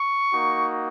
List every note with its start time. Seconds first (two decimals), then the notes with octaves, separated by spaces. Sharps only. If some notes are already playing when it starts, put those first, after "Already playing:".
Already playing: C#6
0.32 A#3 D#4 F#4